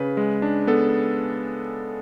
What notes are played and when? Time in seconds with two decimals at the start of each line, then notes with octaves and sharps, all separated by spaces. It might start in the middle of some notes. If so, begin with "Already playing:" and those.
Already playing: C#3 B4
0.17 G#3
0.42 D4
0.67 B3 A4